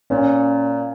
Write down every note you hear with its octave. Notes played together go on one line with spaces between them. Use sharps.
A#2 C#4